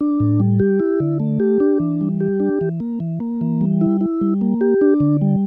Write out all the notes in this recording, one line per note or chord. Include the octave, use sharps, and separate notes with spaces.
D4
A2
G3
G4
E4
D3
A3
G4
D4
E3
G3
G4
D4
E3
A#3
E3
A#3
E3
G3
E4
E4
G3
A#3
G4
D4
D3
G3